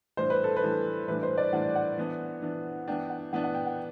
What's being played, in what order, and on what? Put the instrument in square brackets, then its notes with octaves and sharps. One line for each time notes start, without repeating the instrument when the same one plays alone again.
[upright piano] A2 E3 G3 D4 [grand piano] C5
[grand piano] B4
A4
B4
[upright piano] A2 E3 G3 D4
[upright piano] A2 E3 G3 D4 [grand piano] B4
[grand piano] C5
D5
[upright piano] A2 E3 G3 D4 [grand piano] F#5
[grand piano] F#5
[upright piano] E3 B3 D4
E3 B3 D4
[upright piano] E3 B3 D4 [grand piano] G5
[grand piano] F#5
[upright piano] E3 B3 D4 [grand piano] F#5
[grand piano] F#5
G5
F#5